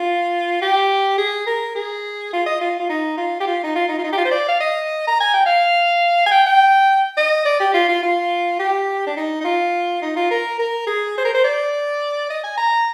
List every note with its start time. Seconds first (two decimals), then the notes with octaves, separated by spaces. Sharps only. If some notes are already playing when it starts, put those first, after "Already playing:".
Already playing: F4
0.62 G4
1.18 G#4
1.47 A#4
1.75 G#4
2.33 F4
2.46 D#5
2.61 F4
2.80 F4
2.89 D#4
3.17 F4
3.40 G4
3.47 F4
3.63 D#4
3.76 F4
3.89 D#4
3.99 F4
4.04 D#4
4.13 G4
4.18 F4
4.25 C5
4.32 D5
4.48 F5
4.60 D#5
5.07 A#5
5.20 G#5
5.34 G5
5.46 F5
6.26 G#5
6.31 G5
6.46 G5
7.17 D#5
7.45 D5
7.60 G4
7.74 F4
7.88 F4
8.02 F4
8.59 G4
9.07 D4
9.17 D#4
9.40 D#4
9.45 F4
10.02 D#4
10.16 F4
10.31 A#4
10.59 A#4
10.87 G#4
11.18 C5
11.25 A#4
11.34 C5
11.44 D5
12.30 D#5
12.43 G#5
12.57 A#5